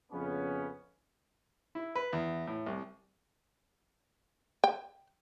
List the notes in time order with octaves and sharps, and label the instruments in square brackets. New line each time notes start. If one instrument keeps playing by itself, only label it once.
[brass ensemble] F2 C#3 B3 C#4
[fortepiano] E4
B4
E2
A2
C2
[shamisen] G5